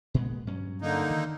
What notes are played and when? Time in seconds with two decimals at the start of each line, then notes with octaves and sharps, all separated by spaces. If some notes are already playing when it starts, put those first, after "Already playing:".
0.14 A#2 G#3 B3
0.47 G2 F#3 C#4
0.82 D3 A#3 D#4
1.10 D#3